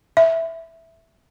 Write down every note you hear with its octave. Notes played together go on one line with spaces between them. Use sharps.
E5